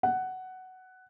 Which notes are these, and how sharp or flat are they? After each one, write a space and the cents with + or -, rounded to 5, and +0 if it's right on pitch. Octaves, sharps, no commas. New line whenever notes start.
F#5 +10